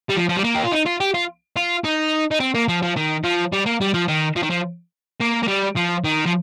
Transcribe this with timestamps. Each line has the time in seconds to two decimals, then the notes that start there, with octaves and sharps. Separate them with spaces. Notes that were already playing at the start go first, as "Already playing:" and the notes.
0.09 G3
0.16 F3
0.29 F3
0.37 G3
0.44 A#3
0.55 G4
0.64 F4
0.72 D#4
0.86 F4
1.01 G4
1.14 F4
1.56 F4
1.84 D#4
2.31 D#4
2.40 C4
2.55 A#3
2.68 F3
2.82 F3
2.96 D#3
3.24 F3
3.52 G3
3.66 A#3
3.81 G3
3.94 F3
4.08 D#3
4.36 F3
4.43 D#3
4.50 F3
5.20 A#3
5.43 A#3
5.48 G3
5.76 F3
6.04 D#3
6.26 F3